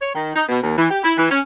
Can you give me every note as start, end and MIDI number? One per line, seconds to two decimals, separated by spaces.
0.01 0.10 73
0.14 0.31 51
0.36 0.43 63
0.48 0.60 47
0.62 0.73 39
0.77 0.89 52
0.91 1.00 67
1.04 1.13 64
1.18 1.29 52
1.31 1.40 61